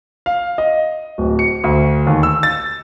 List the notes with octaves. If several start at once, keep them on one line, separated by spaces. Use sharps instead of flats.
F5
D#5
D1
C#7
D2
D#2
E6
A6